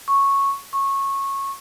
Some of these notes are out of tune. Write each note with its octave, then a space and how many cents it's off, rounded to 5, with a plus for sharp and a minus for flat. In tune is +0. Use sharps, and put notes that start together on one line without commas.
C#6 -10
C#6 -15